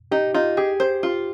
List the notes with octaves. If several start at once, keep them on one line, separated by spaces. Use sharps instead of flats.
D#4 G4
D#4 F4
G4 G#4
C5
F4